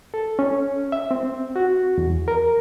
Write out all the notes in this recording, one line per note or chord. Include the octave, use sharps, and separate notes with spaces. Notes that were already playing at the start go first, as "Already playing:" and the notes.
A4
C#4
E5
C4
F#4
E2
A#4